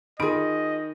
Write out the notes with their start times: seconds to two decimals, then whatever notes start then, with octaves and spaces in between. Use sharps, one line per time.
0.19 D#3 F4 G#4 D#5 B5 D7